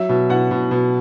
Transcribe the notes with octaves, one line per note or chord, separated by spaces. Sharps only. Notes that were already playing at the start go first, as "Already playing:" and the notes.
Already playing: F#3 E5
B2
B2 F#5
B2
B2